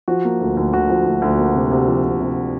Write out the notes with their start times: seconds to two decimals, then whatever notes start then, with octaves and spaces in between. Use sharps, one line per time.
0.08 F3 F#4
0.24 A#3
0.41 D2
0.57 D2
0.73 D2 F#4
0.90 F3
1.07 D2
1.22 D2
1.39 A#3
1.55 C3
1.71 C3
1.88 F3
2.04 C3
2.21 C3